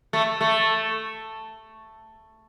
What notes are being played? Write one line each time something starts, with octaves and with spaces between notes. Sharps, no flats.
A3
A3